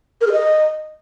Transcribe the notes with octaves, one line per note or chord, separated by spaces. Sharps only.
A#4
G#4
D#5